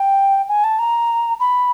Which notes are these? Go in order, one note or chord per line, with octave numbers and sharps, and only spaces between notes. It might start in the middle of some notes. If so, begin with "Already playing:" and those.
Already playing: G5
G#5
A5
A#5
B5